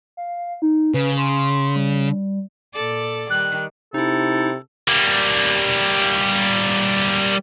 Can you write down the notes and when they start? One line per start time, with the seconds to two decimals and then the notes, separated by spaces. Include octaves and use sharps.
0.17 F5
0.62 D#4
0.94 C#3 B4
1.18 C6
1.76 G3
2.73 A#2 A4 D5
3.30 D#3 G3 F#6
3.94 C3 D#4 E4 A4
4.88 G3 A#3